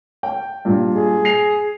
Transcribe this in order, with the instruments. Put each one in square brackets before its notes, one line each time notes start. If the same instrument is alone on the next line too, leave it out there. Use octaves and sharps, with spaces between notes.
[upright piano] G5
G2 A#2
[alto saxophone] G#4
[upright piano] C7 F7